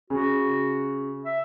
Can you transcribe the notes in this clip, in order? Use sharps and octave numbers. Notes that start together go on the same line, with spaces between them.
C#3 F#4
E5